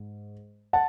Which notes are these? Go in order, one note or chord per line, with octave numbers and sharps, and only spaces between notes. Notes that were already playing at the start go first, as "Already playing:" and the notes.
Already playing: G#2
F#5 A5